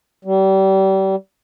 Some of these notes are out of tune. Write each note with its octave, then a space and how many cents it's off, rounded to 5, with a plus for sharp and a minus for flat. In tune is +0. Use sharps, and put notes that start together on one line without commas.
G3 -30